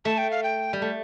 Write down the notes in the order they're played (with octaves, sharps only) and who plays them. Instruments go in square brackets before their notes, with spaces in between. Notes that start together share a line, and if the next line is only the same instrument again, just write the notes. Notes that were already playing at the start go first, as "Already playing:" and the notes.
[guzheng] A3 [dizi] A5
[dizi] G5
F5
G5
[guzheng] G3
A3